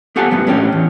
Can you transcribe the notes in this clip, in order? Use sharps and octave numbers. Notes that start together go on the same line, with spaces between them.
B3 G4 A4 F#5 G#5 A5
F#2 A2 B3
A2 C#4 D4 G4
E2